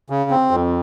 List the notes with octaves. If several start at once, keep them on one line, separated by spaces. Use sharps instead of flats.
C#3
C4
F2